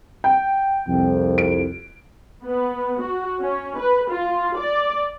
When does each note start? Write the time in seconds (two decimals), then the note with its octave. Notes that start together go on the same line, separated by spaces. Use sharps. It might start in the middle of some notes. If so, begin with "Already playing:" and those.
0.24 G5
0.88 C2 F2
1.38 D7
2.46 B3
3.02 F#4
3.42 C#4
3.79 B4
4.11 F4
4.57 D5